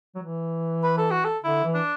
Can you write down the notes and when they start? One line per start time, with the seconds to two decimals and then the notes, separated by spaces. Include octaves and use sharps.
0.15 F#3
0.22 E3
0.83 B4
0.98 A4
1.11 F#4
1.25 A4
1.44 D3 E4
1.64 E3
1.74 D4